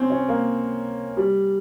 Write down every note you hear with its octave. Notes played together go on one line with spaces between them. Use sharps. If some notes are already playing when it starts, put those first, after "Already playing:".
Already playing: C4 C#4
C#4
A#3
G3